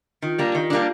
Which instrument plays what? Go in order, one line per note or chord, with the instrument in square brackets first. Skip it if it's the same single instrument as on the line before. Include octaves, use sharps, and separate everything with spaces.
[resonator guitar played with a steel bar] D#3 [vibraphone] F4
[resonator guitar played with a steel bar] G3 A#3 D4 [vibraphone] G4
[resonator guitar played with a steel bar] D#3
G3 A#3 D4